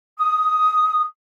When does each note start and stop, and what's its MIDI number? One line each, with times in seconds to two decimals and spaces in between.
0.18 1.03 87